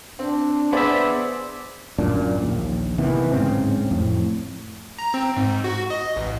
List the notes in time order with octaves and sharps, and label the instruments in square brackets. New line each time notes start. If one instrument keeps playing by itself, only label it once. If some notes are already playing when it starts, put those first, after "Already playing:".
[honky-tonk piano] C4 [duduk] D4
[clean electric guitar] B3 E5 [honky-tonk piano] G#4 C5 D5
[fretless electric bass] D1 F#2 A#2 D4
A#1 D#2
C3 D#3 E3 B3
D1 G#2 C#3 C4
F2 A2
[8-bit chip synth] A#5
C4
G#2
F#4
D#5
A1